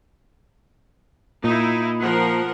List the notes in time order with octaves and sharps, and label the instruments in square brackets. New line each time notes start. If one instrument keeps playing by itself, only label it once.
[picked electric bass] A#2 [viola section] D#4 E4
[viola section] F3 A#4 F#5